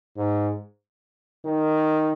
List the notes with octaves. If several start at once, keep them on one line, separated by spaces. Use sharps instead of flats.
G#2
D#3